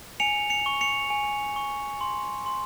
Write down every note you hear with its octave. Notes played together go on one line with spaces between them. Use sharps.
G#5 C#7 F7
C#7 F7
C#6
C#7 F7
G#5
C#6
C6
C6